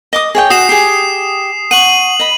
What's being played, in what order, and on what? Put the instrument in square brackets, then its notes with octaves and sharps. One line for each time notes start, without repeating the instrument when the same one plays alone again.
[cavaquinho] D#5 D6 D#6
G#4 C#5 G5
[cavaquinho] F#4 [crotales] D#6 C7 E7
[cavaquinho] G4 G#4 [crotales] C7
[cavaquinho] F#5 C#6 [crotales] D#7 F#7
[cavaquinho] D#5 B5